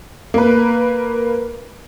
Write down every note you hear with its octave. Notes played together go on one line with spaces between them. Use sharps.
A#3 B4